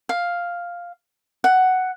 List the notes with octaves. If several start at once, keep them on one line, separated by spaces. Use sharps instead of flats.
F5
F#5